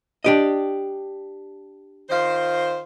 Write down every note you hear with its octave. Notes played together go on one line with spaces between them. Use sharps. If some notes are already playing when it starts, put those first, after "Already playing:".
D4 G4 D#5
D#3 F4 C5